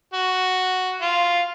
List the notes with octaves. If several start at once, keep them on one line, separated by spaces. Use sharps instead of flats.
F#4
F4